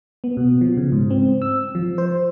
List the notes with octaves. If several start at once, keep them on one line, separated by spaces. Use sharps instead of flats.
B3
B2
F3
C#3
G#2
C4
E6
F3
C5